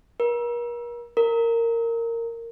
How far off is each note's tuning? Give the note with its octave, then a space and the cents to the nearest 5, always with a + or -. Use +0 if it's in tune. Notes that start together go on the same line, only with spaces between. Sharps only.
A#4 +40
A#4 -15